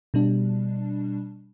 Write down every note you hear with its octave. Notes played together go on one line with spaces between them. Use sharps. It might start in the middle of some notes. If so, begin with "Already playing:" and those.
B2 G3 D4